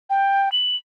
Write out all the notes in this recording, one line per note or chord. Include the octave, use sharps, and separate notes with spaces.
G5
F#7